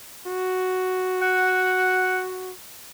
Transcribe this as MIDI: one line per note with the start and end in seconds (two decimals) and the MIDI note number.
0.27 2.52 66
1.22 2.29 78